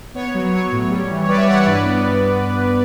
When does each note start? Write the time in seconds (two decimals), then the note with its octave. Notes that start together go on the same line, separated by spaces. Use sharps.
0.14 B3 C#5
0.34 F#3
0.53 F#3 C#5
0.71 A2
0.90 G3
1.10 E3
1.24 C#5
1.28 G3 B4 D5
1.37 C#5 E5
1.46 E3 D5 F#5
1.57 C#5 E5
1.66 G2 B4 D5
1.84 B3
2.04 G2